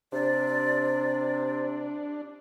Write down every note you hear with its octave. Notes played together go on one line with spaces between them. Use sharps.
C3 D4 D5